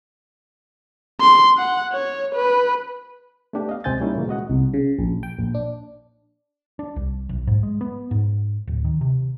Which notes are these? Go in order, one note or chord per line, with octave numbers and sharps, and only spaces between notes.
C6
F#5
C#5
B4
A3 B3 D4 G4
D#5 F5
C#2 C3 C4 G#5 G6 A6
G3 A#3 C#4 D#4 E4
A#2 C#3 E3 A#3
G#3 F#4 D#5 F#5
C2
C#3
A#1
G5
A#1
D4
D4
C2
B1
G#2
G#3
B3
G#2
D1
D#3
C3